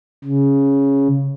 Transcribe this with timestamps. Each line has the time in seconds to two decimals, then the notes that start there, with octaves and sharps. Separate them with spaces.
0.24 C#3